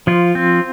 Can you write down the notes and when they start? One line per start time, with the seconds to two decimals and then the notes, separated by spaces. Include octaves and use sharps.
0.07 F3 F4
0.35 C4